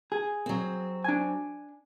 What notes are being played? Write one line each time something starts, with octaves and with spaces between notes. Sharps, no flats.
G#4
F#3 C4
D4 G#5